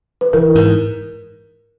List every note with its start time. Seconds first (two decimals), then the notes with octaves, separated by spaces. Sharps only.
0.21 B4
0.33 E3 A#4
0.55 G#2